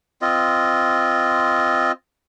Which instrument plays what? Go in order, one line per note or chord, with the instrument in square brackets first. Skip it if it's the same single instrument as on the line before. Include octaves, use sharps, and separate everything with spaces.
[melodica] C4 F4 D#5